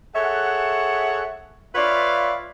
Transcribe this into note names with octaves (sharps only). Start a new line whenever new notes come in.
G#4 A4 C#5 E5 F#5
F4 B4 C#5 D5 E5 F5